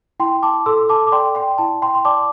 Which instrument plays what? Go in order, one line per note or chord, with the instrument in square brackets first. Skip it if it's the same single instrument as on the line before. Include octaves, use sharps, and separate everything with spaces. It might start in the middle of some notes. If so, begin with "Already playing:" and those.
[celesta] E4 G5 C6
A5 D6
A4 C6 E6
A5 D6
D6
D5 G5 C6
G5 C6
E4 A5
G5 C6
C6
D5 A5 D6